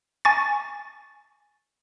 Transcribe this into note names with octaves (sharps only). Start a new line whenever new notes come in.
G#5 C#6 A6